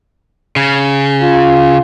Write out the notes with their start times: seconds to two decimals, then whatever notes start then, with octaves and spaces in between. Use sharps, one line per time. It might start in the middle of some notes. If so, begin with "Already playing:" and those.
0.56 C#3
1.23 F4